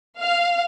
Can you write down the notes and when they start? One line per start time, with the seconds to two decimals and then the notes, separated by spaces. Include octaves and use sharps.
0.20 F5